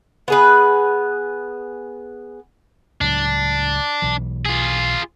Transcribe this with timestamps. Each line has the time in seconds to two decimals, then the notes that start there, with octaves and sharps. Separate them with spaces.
0.28 B3 G#4 B4
3.01 C#2 A2 F#3 D4
4.02 B1 E3
4.46 F4 G#4